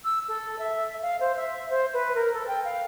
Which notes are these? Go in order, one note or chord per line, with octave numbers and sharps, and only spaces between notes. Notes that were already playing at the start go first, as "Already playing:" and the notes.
E6
A4
E5
F5
C5
E5
C5
B4
A#4
A4
G5
F5